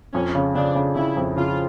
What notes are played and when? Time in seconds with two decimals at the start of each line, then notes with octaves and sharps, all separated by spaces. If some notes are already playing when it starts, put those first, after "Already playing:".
0.14 F2 C#4
0.35 C#3
0.55 C#3 D4
0.75 C#3
0.96 C#3 E4
1.17 F2
1.37 C#3 F4